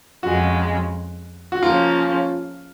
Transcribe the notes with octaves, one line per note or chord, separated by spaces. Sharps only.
F2 C#3 G#3 F#4
F#4
C#3 F3 A#3 C#4 F4